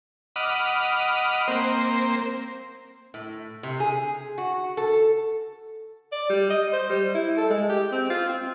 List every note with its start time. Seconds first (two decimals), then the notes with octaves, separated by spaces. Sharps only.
0.36 D#5 F#5 B5 D6 D#6 F6
1.48 A#3 C4 C5
3.14 A2
3.63 C3
3.80 G#4
4.38 F#4
4.77 A4
6.12 D5
6.29 G3
6.50 D#5
6.73 C5
6.90 G3
7.15 E4
7.37 A4
7.50 G#3
7.69 G4
7.92 C4
8.10 F4
8.29 C4